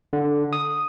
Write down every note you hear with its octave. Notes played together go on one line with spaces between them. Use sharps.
D3
D#6